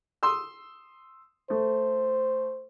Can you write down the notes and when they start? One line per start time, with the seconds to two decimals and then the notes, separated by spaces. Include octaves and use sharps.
0.23 C6 D#6 E6
1.50 A3 C5